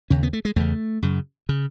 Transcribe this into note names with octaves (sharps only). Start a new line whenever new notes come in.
D#2 C#3 C#4
B3
A3
G#3
E2 C#3 A3
F#2 C#3
C#3